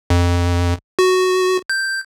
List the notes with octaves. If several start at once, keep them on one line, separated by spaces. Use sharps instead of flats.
F2
F#4
G6